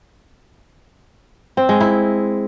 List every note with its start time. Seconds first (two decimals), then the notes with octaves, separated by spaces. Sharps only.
1.57 C4
1.69 G#3
1.81 E4